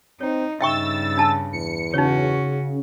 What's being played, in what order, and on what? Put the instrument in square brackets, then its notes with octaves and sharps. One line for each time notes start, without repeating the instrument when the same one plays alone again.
[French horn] C4 [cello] D#4 [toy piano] C#5
[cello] G2 C#3 [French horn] D#4 [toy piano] E5 G5 C#6 [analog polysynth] E6 A6
[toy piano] D4 A5
[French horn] E2 [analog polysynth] C#7
[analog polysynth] C#3 [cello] C#4 F#4 [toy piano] D#4 C#5